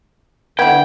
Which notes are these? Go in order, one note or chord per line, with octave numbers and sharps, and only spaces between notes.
D3 B3 E4 F#5 G5 G6 G#6